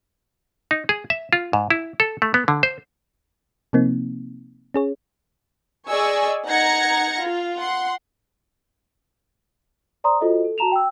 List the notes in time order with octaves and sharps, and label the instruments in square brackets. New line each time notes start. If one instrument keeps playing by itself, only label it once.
[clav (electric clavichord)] D#4
G#4
E5
F4
G#2
E4
A4
A3
B3
D3
C5
[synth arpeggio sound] C3 F3 A#3 C4 D#4
C#4 G#4 C#5
[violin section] G#4 D5 D#5 G#5 C#6 E6
D#4 F#5 A#5 G#6 A#6 C#7
F4
F#5 C6
[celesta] C5 D5 A#5 C6 D#6
F4 F#4 A4 C5 D#5
A4
F#4 A5 A#5 E7 F7
G5 E6